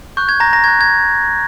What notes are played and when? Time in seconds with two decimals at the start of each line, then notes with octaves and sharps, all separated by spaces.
0.17 C#6 F#6 G6
0.29 G#6
0.40 A#5 A#6
0.53 A#5 A#6
0.64 C#6 F#6 G#6
0.81 G#6